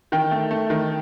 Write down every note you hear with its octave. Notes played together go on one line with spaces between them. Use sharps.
D#3 G5
A3
A3
D#3